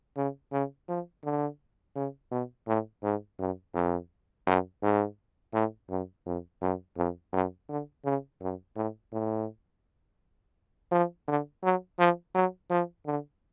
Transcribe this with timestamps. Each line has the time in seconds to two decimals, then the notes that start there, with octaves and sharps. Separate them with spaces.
0.17 C#3
0.52 C#3
0.89 F3
1.24 D3
1.95 C#3
2.31 B2
2.68 A2
3.03 G#2
3.40 F#2
3.74 F2
4.47 F#2
4.83 G#2
5.54 A2
5.89 F#2
6.26 F2
6.62 F#2
6.98 F2
7.33 F#2
7.69 D3
8.05 C#3
8.41 F#2
8.76 A2
9.13 A2
10.92 F3
11.28 D3
11.63 F#3
11.99 F3
12.34 F#3
12.70 F3
13.06 D3